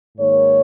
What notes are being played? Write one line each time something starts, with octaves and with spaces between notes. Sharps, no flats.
G#2 D#3 A#3 C#5